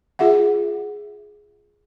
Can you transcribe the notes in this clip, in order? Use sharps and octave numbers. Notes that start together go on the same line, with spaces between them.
F4 G#4 E5 F#5